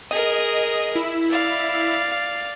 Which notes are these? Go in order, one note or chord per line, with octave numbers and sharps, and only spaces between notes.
G#4 A#4 D#5
E4
D5 F5